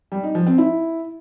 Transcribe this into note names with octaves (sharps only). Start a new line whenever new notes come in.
G3
D#4
F3
C4
E4